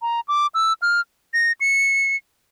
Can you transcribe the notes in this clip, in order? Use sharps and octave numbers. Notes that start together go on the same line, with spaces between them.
A#5
D6
E6
F6
A#6
C#7